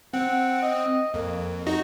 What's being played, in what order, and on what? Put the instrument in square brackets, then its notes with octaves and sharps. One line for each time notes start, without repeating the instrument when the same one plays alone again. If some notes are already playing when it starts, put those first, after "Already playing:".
[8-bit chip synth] C4 [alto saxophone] F#5
[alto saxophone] D#5
[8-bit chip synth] F2 [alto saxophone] A#3
[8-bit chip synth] D#4 F#4 D#5